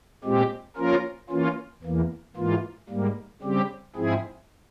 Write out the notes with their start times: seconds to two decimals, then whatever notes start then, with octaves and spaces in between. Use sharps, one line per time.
0.24 A#2 G#3 C4 G4
0.77 F3 A#3 C#4 F4 A#4
1.30 E3 A#3 C#4 F4
1.83 E2 E3 A#3
2.36 G#2 E3 A#3 F4
2.89 G#2 G3 A#3
3.42 C#3 G3 C4 G4
3.95 G#2 F3 C4 E4 G#4